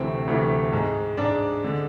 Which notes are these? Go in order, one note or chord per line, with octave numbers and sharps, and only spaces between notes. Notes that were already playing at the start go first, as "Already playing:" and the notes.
Already playing: D2 C3 E3 A3 C4 C5
D2 C3 E3 A3
G#2 G#3
G#2 G#3 D4 D5
D3 G#3